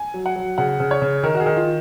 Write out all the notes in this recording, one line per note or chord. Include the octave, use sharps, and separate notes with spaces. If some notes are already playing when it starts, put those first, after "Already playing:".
Already playing: G#5
F#3
F#5
F#3
C#3 F#5
C#3
C#5
C#3
D#3 A#4
F#4
G#4
D#3
F4